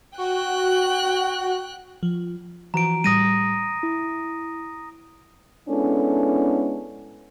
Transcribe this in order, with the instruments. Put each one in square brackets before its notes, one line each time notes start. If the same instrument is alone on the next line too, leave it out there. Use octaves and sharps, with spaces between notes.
[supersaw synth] F#4 [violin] G5 F#6
[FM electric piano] F3
[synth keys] E3 F3 F#4 [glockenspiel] A#5 D7
[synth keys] A2 G3 [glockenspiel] D#6 A#6 D#7
[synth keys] E4
[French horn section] G#3 B3 C#4 D4 E4 A4